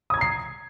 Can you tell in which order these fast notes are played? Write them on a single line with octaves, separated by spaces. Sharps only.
D#6 G#6 A#5 C7